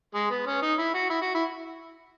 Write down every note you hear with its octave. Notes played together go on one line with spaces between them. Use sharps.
G#3
B3
C#4
D#4
E4
F#4
E4
F#4
E4